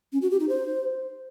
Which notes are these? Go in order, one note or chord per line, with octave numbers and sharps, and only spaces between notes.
C#4
F#4
G4
D#4
C5